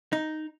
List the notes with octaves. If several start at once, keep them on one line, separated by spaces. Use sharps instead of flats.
D#4